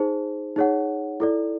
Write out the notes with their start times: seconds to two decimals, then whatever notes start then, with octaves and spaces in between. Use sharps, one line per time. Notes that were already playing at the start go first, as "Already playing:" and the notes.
Already playing: D#4 G#4 C5
0.56 D#4 G#4 C#5 F#5
1.20 E4 A4 D5